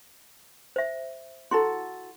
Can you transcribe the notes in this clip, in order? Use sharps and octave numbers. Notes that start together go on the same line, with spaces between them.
C5 E5
E4 F#4 A4 C6